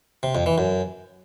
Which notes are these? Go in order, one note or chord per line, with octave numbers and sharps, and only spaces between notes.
C3
F2
E3
F#2